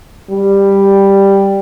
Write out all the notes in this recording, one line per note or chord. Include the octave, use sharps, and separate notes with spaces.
G3